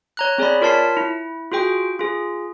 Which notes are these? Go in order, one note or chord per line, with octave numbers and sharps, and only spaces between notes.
C#5 A#5 F#6
C4 G#4 C#5 D5 B5
F4 A#4 C#5 A5 B6 C7
E4
F4 F#4 G#4 G5
F4 G#4